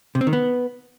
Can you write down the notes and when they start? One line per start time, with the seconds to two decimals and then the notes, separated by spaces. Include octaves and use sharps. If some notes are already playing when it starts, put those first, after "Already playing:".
0.15 C3
0.21 C4
0.27 D#3
0.33 B3